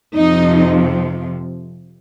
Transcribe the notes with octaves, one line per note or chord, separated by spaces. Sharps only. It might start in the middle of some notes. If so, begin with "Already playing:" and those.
F2 C3 F3 D#4